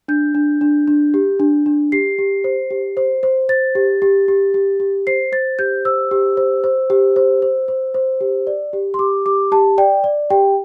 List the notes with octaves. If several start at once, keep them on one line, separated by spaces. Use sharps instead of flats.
D4 G6
D4
D4
D4
G4
D4
D4
G4 C7
G4
C5
G4
C5
C5
C5 A6
G4
G4
G4
G4
G4
C5 C7
C5 A6
G4 G6
C5 E6
G4
C5
C5
G4
C5
C5
C5
C5
G4
D5
G4
C6
G4 D6
G4 D6
G4 A5
D5 G5
D5
G4 G5